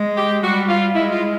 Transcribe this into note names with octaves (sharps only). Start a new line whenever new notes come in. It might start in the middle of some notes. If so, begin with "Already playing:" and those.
Already playing: G#3
G4
G3 F#4
F4
G#3 E4
F4